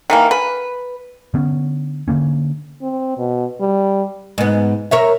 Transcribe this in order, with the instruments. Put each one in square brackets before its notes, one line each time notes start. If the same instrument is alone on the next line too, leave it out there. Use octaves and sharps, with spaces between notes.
[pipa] D#3 E3 A#3
B4
[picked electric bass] D3 B3 C#4
D3 F#3 A#3 C#4
[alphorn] C4
B2
G3
[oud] G#2 B3
A#4 C#5 E5